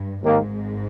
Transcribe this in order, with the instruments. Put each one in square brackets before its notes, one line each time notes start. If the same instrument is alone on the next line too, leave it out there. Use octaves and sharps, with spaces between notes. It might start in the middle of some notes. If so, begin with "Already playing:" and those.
Already playing: [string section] G2
[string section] G#1 G#2 [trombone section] D#2 D#3 A#3